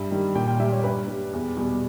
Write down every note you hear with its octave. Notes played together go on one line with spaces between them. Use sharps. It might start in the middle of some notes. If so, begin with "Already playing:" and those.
Already playing: G2 E5
D#3 G3
A#2 G5
G5
G3 E5
C#5
G2 B4
G3
E2
B2 G3